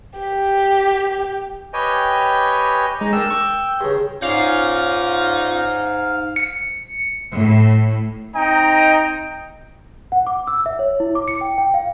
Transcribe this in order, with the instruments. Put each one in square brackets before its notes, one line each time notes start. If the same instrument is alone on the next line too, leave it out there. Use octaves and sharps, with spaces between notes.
[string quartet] G4
[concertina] G4 B4 C#5 D#5 G5 G#5
[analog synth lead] G#3 [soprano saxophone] D#4
[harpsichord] D4 A#4 [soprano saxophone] G5 [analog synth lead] E6
[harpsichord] C#6 D6
G2 C#3
[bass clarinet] G#2 [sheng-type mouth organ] C#4 F4 D5 [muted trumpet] D#4 [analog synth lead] F5
[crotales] C#7
[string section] A2
[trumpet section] C4 D#4 D#5 G5 A#5
[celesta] F#5
D6
E6
E5
C#5
E4
D6
C#7
G5
G5
F5